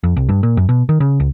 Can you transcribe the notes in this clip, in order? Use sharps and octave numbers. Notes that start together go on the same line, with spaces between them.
F2
C2
G2
A#2
F#2
B2
D#3
C#3
C#2